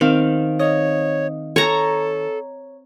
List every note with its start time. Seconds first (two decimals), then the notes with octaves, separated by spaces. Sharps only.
0.01 D#3 C4 F5
0.59 C#5 D#5
1.56 A4 C#5 A#5